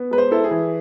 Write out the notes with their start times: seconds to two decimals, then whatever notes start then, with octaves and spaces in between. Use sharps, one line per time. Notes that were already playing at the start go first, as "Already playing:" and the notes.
Already playing: B3
0.11 G#3 B4
0.18 C5
0.31 E4 A4
0.44 G#4
0.51 E3